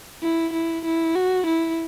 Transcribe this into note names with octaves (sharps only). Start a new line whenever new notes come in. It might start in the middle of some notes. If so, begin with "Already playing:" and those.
E4
E4
E4
F#4
E4